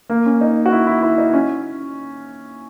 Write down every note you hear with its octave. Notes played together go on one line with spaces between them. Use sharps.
A#3
C#4
D#4
F#4
E4
E4
E4
D#4
C#4